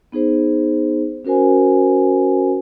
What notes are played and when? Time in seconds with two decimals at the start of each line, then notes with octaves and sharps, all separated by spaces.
0.12 B3 D#4 G#4 C5
1.25 C#4 F#4 A#4 C5 G#5